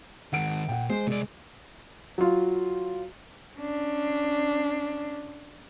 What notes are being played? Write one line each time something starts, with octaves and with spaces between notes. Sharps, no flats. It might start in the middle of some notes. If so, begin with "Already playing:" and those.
D#3 G#3 F#5 D7
A#2 F#5 G5
G#3 C5
C2 G#3 D5
F#3 F4
C#4 D4